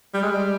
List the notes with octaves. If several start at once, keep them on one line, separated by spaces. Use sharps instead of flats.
G3
G#3
G3